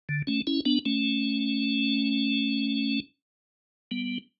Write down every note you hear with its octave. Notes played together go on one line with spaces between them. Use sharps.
D3
A3 C#4
C#4 E4
B3 D4
A3 C#4
G3 B3